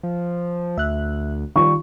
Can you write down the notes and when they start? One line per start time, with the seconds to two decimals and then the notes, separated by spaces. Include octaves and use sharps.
0.03 F3
0.78 D2 E5 F#6
1.56 D#3 G3 F4 C#6